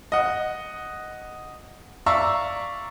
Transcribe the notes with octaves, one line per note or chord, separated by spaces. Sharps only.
D#5 F#5
D5 E5 F5 A#5 C#6 E6